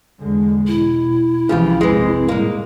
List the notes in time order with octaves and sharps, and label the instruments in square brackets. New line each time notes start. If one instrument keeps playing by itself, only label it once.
[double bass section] E2 D3 G#3
[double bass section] B2 [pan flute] E4
[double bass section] C2 E3 F3 [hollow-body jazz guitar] C#3 F4 G4
[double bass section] F1 A#1 C4 [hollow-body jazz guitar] E3 G#3
[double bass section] A2 G3 [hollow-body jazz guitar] G#3 A#3